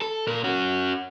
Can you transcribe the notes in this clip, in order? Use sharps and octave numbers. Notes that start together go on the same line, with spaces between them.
A4
A#2 A#4
C#4 F#4